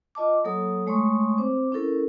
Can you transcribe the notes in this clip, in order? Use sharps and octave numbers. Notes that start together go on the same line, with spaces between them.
F4 D#5 A5 D6
F#3 A#3 A4 C#5 D#6
G#3 A3 C#5 C6 C#6 D#6
C4 C5 D6
C#4 E4 A4 A#4